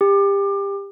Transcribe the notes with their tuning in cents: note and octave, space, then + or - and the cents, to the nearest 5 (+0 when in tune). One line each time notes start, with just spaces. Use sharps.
G4 +25